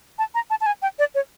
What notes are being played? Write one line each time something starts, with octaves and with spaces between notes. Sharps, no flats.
A5
A#5
A5
A5
G#5
G5
D5
C#5